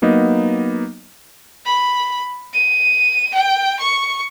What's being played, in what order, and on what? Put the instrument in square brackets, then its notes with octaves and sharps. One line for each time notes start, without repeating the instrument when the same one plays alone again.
[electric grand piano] F#3 A#3 B3 D#4 D#5
[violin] B5
D#7
G5
C#6